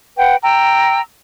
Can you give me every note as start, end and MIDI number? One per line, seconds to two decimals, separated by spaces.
0.16 0.36 71
0.16 0.36 78
0.16 0.36 79
0.43 0.99 79
0.43 0.99 82
0.43 0.99 88